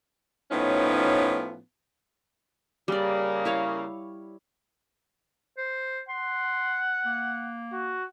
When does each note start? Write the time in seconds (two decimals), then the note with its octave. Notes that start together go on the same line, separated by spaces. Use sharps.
0.51 A2 F3 B3 C#4 D#4
2.88 C#3 G3 A#3 D5
3.45 E4 C#5 F5
5.58 C5
6.09 F#5 C6
7.06 A#3
7.73 F#4